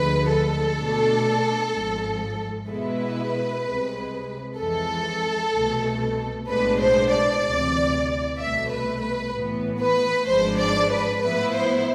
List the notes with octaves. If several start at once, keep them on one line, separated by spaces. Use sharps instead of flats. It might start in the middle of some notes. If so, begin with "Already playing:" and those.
Already playing: D2 D3 F3 G#3 B4
A4
B2 A3 D4
G#1 G#2 F3
B2 G#3 B3 E4 B4
C2 C3 G#3
F2 E3 G#3 A4
C2 B2 A3
B1 A2 G#3 B3 D4 B4
C5
D5
D2 C3 E3
C2 B2 A3 E5
B4
B4
A1 A2 E3 B3
B4
G#1 G#2 F3 G#3 D4 C5
D5
B4
A2 F3 B3 E4 B4
C5